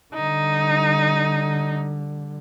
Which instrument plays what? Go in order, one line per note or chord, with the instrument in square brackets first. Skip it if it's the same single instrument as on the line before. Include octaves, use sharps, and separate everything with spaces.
[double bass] D3 G3 [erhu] D#4